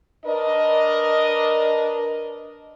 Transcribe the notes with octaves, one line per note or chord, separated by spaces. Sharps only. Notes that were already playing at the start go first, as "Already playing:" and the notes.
D4 A#4 B4 D5 D#5